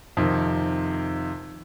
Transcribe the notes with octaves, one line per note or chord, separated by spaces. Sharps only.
F2 C3 D#3